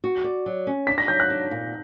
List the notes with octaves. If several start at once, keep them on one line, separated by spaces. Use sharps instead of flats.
F#4
D5
F#3
C#4
D4 B6
A#6
F#3 G6
F#6
D4
A#2